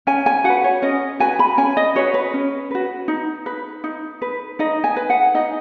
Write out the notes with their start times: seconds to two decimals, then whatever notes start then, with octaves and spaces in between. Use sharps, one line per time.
0.07 C#4 G#5
0.26 G#5
0.44 F#4 B4 F#5
0.64 C#5
0.82 C#4 D#5
1.19 F#4 B4 G#5
1.39 B5
1.58 C#4 G#5
1.77 D#5
1.95 F#4 B4 C#5
2.14 B4
2.34 C#4
2.71 F#4 B4
3.08 D#4
3.46 B4
3.84 D#4
4.22 B4
4.59 D#4 D#5
4.84 G#5
4.96 B4
5.10 F#5
5.34 D#4 D#5